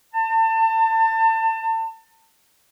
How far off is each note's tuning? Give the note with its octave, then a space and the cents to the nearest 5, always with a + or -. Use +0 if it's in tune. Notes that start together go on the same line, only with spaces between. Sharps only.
A5 +30